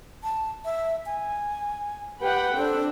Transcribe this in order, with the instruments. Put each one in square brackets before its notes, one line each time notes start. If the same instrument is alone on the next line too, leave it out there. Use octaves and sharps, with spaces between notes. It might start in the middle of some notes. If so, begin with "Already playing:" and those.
[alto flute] A5
E5
G#5
[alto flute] G4 [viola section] B4 F#5 G5
[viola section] C4 D4 [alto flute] A4